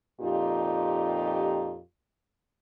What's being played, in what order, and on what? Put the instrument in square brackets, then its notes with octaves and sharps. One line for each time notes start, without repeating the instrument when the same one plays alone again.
[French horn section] F2 A#2 D#4 F4 G4